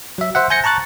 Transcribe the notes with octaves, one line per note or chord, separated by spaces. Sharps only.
F#3 E5
C5 E5 F#5
G#5 G6 A#6 C#7
A5 A#5 C#6 F#6 A6